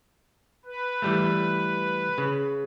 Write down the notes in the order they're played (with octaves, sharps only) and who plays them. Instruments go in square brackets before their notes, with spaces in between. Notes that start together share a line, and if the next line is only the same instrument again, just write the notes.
[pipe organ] B4
[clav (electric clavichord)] E3 G3 A3
C#3